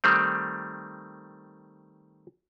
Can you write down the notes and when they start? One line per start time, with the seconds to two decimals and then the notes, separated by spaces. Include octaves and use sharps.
0.04 D#3 G3 A3 C4